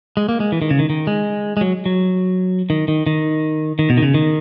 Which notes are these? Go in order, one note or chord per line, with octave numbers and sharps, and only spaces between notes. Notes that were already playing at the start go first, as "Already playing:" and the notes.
G#3
A#3
G#3
E3
D#3
C#3
D#3
D#3
G#3
G#3
F#3
F#3
D#3
D#3
D#3
D#3
B2
D#3
C#3
D#3